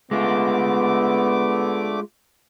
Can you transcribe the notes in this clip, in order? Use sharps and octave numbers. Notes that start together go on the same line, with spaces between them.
D3 G#3 A3 B3 F4 D6